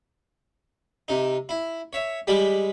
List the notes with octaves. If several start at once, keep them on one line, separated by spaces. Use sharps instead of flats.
C3 D#4
E4
C#5 E5
G3 G#3 G4 B5